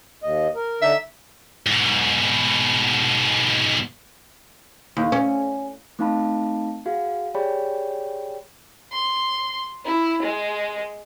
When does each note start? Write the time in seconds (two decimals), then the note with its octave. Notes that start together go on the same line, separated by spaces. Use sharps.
0.23 D#2 D#5
0.55 A#4
0.82 D3 D4 D#4 E5
1.66 G#2 B2
4.97 D#2
5.12 C#4
5.99 A3 C4 D#4 F5 A5 B5
6.86 F#4 G#4 F5
7.34 G4 G#4 C#5 D5 G5 B5
8.92 C6
9.85 E4
10.22 G#3